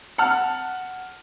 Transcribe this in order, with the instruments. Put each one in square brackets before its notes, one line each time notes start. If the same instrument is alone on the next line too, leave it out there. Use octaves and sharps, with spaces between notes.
[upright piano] F#5 A5 F6